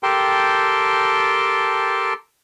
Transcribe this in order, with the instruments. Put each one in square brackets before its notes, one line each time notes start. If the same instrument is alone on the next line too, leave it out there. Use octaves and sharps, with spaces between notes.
[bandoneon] G4 A4 A#4 G5 A5 C6